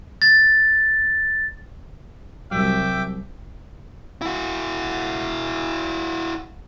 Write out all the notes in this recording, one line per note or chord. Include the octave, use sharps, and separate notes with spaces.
A6
C2 F#3 G3 E5 G5 D6
E4 F#4